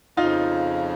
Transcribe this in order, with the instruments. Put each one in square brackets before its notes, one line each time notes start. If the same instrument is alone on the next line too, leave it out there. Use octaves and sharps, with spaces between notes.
[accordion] F2 C#3 F3 [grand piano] D#4 F4